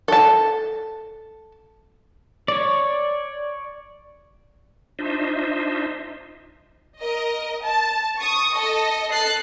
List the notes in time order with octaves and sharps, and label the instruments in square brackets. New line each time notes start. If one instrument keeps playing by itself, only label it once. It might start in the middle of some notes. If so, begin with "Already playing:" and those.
[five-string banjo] A4 A5
[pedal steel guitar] C#5 D5
[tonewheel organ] D4 D#4 F4 C5 D#5 E5
[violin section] A#4 D#5
A5
C#6 D#6
A4 D#5
A4 F#6 A6 C7